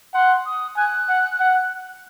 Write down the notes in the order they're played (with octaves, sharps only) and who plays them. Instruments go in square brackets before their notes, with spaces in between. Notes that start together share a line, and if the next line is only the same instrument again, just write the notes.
[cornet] F#5 [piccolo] C6
[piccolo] D#6
[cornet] G#5 [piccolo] F#6
[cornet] F#5
F#5